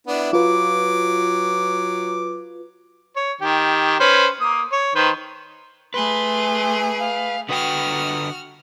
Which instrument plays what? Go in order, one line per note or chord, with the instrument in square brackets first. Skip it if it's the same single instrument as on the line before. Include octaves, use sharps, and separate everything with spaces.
[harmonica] B3 D4 E4
[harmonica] F#3 D6 [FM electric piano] F4 B4
[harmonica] C#5
D#3 G4
C#4 B4 C5
A#3 D#6
C#5
D#3 B4 C5
[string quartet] A3 G#4 [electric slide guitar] B4 [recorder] C6
[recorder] F5
[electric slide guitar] D3 B4 G5 [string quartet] F#4 F6 [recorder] D#6